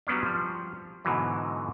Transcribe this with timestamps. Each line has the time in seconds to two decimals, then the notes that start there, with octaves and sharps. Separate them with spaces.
0.07 F#3 G3 B3 C#4 D4
0.23 F3 G3
1.05 G#2 B2 D3 E3 F#3